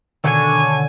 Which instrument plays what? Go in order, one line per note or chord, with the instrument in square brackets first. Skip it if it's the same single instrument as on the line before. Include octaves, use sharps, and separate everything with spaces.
[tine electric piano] B2 D#3 E6 [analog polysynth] D3 [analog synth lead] C#5 [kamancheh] G#5